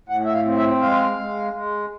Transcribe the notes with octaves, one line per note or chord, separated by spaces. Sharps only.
A2 F#5
E5
F5
C4
E5
G#3 F5
G#3
G#3